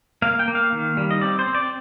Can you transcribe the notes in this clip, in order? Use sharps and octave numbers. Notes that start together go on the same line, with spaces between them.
A#3 F5
G5
A#3
F5
D#3
G3
D#5
C4 D5
C5
C4
D5